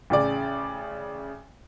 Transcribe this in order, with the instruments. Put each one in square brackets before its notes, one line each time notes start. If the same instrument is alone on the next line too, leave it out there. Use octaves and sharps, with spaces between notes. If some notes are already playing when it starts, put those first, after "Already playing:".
[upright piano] A1 C#3 D5